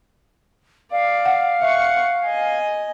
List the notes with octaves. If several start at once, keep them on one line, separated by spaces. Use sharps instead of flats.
D5 F5
F#5
E5 F#5 C#6
D#5 G#5